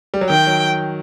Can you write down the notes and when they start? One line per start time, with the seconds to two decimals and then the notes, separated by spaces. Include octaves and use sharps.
0.14 G3
0.21 F#3
0.30 D#3 G5
0.47 F#3